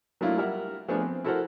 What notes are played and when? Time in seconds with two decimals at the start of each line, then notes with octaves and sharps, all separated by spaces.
0.21 F#3 A3 A#3 D4 E4 F4
0.37 G3 A#4 E5 F#5
0.88 F3 A3 B3 D4 G#4
1.01 C4
1.24 E4 F#4 A4 A#4 C5 F#5